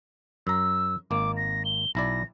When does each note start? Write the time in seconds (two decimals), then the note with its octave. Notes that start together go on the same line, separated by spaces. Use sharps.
0.47 F#2 A#5 E6
1.11 G#1 A#3 D6
1.37 A#6
1.65 G7
1.95 B1 E4 D5 A#6